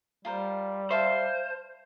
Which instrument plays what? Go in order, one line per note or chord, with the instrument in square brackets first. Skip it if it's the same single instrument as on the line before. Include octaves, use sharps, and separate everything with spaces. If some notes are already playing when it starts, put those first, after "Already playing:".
[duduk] G3 [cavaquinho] F4 A#4 C5
[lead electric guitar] C5 [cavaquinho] E5 F5 A5